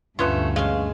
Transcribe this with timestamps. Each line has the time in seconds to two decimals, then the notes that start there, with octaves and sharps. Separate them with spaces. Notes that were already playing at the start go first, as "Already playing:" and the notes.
0.19 D2 G2 B2 A3 B3 C#4 F4
0.56 G#3 C#4 F5